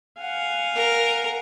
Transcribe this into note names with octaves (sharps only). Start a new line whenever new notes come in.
F5 F#5 G#5
A#4